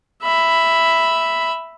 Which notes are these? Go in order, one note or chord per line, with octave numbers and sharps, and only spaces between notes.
E5 B5